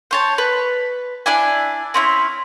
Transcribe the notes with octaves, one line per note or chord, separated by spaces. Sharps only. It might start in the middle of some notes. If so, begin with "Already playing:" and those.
C5 C#5 A5
B4
D4 E4 D5 G#5
C4 C#4 E4